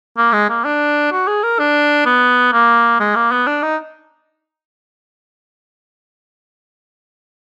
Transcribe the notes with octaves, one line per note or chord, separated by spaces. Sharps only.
A#3
G#3
A#3
D4
F#4
G#4
A#4
D4
B3
A#3
G#3
A#3
B3
D4
D#4